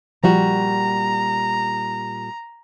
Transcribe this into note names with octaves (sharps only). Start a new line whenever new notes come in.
A#2 F3 G3 F#4 A#5